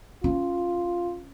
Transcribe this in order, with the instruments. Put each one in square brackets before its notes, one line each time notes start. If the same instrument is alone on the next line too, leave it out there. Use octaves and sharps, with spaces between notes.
[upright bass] C#4 [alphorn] F4